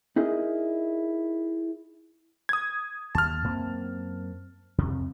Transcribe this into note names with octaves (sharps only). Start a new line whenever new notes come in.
D#4 E4 G#4 A#4 D#5
D#6 G#6
D#2 A5 F6
F#2 A#3 C4
F2 C3